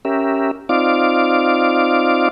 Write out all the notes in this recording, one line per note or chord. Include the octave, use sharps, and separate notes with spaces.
C#4 G4 A#4 E5
C4 D#4 F4 D5 F5 D6